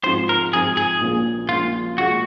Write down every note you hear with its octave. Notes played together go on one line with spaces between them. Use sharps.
G#2 F3 C4 F4 C5
A#4
G#2 F3 C4 F4 G#4
G#4
A#1 A#2 F3 A#3 C#4
A#1 A#2 F3 A#3 C#4 F4
A#2 G#3 C#4 F4 F#4